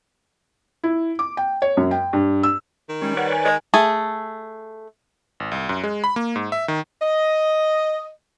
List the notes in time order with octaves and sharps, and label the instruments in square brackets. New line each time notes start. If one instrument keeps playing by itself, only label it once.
[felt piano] E4
D6
G5
C#5
F#2
G5
G2
E6
[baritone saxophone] D#3
[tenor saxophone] G3 [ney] G#3 [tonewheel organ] C#4
[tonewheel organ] B4 C#5 D5 [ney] F#5
[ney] G#5
[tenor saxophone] G#3
[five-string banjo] A3 G#4
[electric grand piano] G#1
C2
F#2
G#3
B5
A#3
G#2
E5
D#3
[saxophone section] D#5